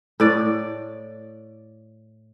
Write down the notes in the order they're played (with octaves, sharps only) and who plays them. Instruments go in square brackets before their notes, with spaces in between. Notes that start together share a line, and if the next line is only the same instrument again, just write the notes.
[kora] A2 D5